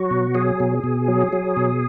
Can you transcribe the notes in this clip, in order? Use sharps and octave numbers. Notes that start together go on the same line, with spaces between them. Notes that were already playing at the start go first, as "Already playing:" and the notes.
Already playing: F#3 F#4
B2
F#3 G#4
B2
B2
F#3
F#3
B2